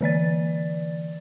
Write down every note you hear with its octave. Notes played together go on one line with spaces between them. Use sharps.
D3 E3 D5 A6